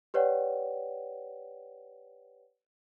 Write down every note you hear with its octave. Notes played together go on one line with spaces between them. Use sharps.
G4 B4 C#5 D5 F#5 G5